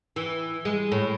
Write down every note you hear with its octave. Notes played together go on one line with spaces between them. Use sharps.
E3
G#3
A2